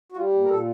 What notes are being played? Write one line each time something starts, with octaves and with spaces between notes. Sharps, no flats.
F#4
G3 F4
A#2
A#4
A#2 A4